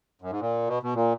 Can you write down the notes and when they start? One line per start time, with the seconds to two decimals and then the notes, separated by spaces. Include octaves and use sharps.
0.22 F#2
0.31 G#2
0.40 A#2
0.68 B2
0.83 B2
0.94 A#2